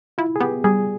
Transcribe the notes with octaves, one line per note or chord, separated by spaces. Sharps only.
E4 F4
G#4
B3 G4
G3 G#4